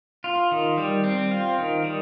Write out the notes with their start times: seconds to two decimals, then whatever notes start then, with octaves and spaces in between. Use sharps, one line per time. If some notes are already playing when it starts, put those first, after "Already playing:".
0.24 F4
0.52 D#3
0.78 G3
1.04 C4
1.31 F4
1.58 D#3
1.84 G3